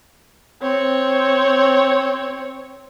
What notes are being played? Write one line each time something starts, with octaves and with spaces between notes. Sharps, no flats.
C4 C#5